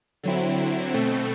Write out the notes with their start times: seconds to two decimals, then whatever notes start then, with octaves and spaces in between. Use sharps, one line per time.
0.23 D3 F#3 C4 E4
0.94 B2 A3 C4